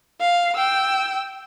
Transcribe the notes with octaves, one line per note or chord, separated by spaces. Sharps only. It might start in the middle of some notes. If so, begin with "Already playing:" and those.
F5
G5 E6